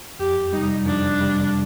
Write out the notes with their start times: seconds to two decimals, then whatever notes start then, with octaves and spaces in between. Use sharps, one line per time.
0.19 F2 G4
0.53 C3 G3 D#4
0.86 F2 D4
1.20 C3 G3